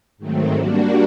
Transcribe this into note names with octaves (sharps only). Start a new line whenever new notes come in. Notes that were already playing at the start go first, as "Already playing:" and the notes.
G#2 D#3 F#3 A3 C4
G3 A#3 D4 F#4